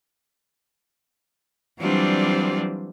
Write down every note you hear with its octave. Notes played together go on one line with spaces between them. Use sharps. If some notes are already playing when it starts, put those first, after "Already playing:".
E3 F#3 G3 C4 D4 F4